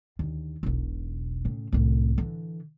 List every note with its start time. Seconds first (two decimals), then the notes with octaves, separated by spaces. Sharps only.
0.19 D#2 D3
0.63 E1 B1
1.45 A2 C#3
1.73 C2 A2
2.18 D3 E3